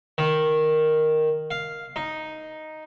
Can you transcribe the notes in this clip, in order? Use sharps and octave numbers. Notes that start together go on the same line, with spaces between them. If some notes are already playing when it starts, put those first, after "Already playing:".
D#3
F5
D#4